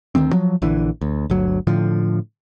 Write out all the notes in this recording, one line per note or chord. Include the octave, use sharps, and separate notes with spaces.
D2 D#3 A#3 C4
F3 F#3
A#1 D3 E3
D2
G1 D2 F#3
A2 D3 F3